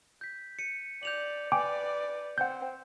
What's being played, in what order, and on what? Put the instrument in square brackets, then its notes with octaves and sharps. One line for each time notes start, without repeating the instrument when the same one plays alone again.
[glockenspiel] G6 B6
C#7 D#7
[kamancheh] D5 [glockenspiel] G6 F7 F#7
[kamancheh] B4 D5 [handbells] G5 G#5 D6
[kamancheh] C4 [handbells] F#5 G6